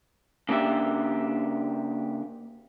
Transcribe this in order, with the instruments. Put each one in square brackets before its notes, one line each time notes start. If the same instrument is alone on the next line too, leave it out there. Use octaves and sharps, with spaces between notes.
[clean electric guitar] C#3 A#3 D4 G4 E5